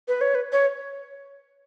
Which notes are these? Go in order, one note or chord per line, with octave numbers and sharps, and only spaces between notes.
B4
C#5
B4
C#5